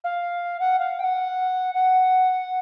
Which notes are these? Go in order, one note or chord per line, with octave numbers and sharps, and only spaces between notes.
F5
F#5
F5
G5
F#5
F#5